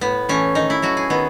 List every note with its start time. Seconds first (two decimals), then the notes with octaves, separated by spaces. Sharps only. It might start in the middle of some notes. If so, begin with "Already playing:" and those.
0.01 A2 B3
0.29 E3 A3 C#4
0.55 D#3 D#4
0.70 E4
0.82 F#3 A3 F#4
0.97 G#4
1.10 D#3 B3